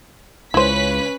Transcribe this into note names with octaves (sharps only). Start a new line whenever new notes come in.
C#2 C#3 G#3 C#4 E4 B4 C5 B6